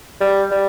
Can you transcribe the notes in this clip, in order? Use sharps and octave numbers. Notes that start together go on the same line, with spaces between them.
G3
G3